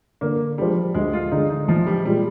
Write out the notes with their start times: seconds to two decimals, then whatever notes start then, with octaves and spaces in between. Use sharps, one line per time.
0.21 D3 A#3
0.58 F3 G3 G#3 D4
0.94 D2 G#3
1.13 F4
1.32 D3 G#3 D#4
1.50 D#4
1.68 A#1 F3
1.87 G3
2.05 A#2 G3 G#3